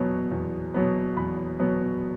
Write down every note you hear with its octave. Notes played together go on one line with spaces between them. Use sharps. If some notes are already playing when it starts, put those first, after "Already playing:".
Already playing: E2 B2 F#3 B3
E2
B2 F#3 B3
E2 B5
B2 F#3 B3